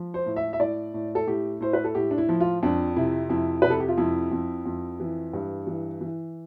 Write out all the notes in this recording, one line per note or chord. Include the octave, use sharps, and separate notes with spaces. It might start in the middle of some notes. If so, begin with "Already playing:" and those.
Already playing: F3
C5
A2
E5
E5
A2 D5
A2
A4
A2 G4
A2 C5
B4
A4
A2 G4
D4
E4
F3
F4
F2 D4
C3 E4
F2 E4
C3 B4
A4
G4
F4
F2 E4
F2
F2
E3
G2
E3
E3